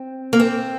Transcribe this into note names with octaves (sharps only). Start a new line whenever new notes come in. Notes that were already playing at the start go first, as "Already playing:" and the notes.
Already playing: C4
A#3
C4